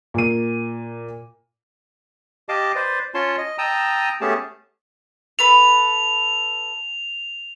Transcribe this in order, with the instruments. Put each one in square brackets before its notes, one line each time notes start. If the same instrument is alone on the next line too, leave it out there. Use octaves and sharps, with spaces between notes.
[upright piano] A#2 D#7
[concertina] G4 D#5 F5 A5 D6
B4 C5 D5
C#4 F4 C#5 A5 C6
D#5
G5 A5 A#5 D#6 E6
A3 B3 C#4 G4 G#4 A5
[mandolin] A4 B4 B5 [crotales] F7